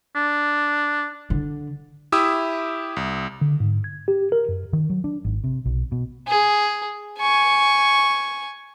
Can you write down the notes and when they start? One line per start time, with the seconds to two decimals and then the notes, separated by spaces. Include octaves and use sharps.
0.16 D4
1.30 D3
2.12 E4 G4 E5 D#6 E6
2.96 C2
3.41 D3
3.60 G#2
3.84 G#6
4.08 G4
4.32 A#4
4.49 F#2
4.73 D#3
4.90 F#3
5.04 D4
5.25 G#1
5.44 C3
5.65 B1
5.92 B2
6.27 G#4
7.19 G#5 C#6